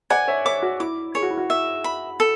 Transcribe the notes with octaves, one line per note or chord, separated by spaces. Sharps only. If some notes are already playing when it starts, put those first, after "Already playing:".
D5 F#5 G#5
C#5 E5
C#5 E5 D6
F#4
E4 D6
G#4 C#5
F#4
E4
F#4
E5
B5
A4